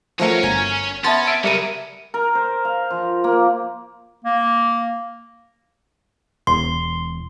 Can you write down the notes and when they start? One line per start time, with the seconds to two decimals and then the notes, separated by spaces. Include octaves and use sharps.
0.20 F3 A3 C#4 F#4 A#4 C#5 F5 C#7
0.43 G1 G#5 A#5
1.04 B3 C#4 E5 A5 C6 A6
1.27 E5 D7
1.44 C#3 F#3 G3 A#4 E5 C#7 D#7
2.14 A#4
2.35 C5
2.65 F5
2.90 F3
3.24 A#3
4.24 A#3
6.47 E1 C6